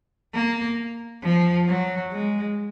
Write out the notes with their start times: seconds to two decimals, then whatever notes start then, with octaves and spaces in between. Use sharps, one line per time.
0.34 A#3
1.23 F3
1.67 F#3
2.12 G#3